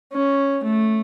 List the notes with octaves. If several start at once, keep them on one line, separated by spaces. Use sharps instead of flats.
C#4
A3